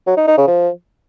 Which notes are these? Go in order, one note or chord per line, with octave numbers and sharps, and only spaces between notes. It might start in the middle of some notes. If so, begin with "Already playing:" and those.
F#3
D#4
D#4
C#3
F3